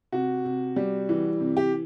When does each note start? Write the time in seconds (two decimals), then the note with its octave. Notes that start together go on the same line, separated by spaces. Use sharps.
0.12 C3 F#4
0.44 C3
0.76 G3
1.09 E3
1.40 C3
1.57 G4